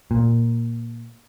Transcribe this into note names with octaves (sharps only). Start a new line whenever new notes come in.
A#2